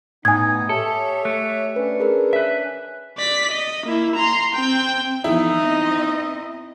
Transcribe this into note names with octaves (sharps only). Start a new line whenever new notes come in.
A2 B3 D#4 G#5 D#6 G#6
G4 A4 C#5 E5
A3 F#6
C#4 D4 B4
G#4 A#4 B4
B4 E5 B6
D5 B6
D#5
A#3 E4
A#5 C6
C4 G5
E3 F3 B3 D#4 E4
B3 C4 D#5